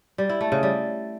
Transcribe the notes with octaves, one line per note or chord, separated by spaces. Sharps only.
G3
E4
A3
C#3
G3